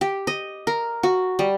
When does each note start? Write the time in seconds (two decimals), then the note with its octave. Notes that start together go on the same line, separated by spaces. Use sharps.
0.01 G4
0.27 D#5
0.67 A#4
1.03 F#4
1.39 G3